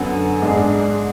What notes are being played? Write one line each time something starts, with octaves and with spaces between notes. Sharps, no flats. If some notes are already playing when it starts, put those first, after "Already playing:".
Already playing: F#2 D3 F#3 B3
G#2 G#3 D4 G#4